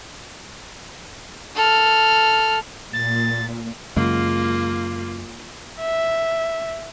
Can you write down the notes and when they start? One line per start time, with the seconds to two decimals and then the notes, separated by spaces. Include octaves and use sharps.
1.56 A4 F6
2.93 A#2 A6
3.97 F#2 C#3 G#3 A#3 F4
5.81 E5